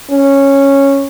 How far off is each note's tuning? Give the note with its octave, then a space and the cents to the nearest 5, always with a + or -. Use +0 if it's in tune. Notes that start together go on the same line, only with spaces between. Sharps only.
C#4 -5